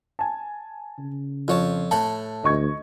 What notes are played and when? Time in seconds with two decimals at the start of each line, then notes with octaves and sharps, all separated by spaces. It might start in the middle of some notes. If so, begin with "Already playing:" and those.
0.19 G#5 A5
0.99 C#3
1.48 F2 F4 C#5 A5
1.91 A2 F#5 G5 A5
2.44 D2 D#5 C#6 G#6